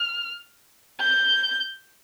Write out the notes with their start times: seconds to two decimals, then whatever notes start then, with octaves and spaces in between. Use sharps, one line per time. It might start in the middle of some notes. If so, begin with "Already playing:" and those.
Already playing: F6
1.00 G6